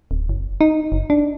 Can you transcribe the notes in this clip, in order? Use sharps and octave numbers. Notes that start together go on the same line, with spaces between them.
D1
F#1
D#4
F#1
D4